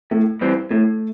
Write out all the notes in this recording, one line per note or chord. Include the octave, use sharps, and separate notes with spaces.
A2 A3
E3 G3 C4
A2 A3